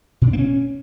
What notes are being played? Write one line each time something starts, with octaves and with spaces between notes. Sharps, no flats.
B2
D4
A#3
C#4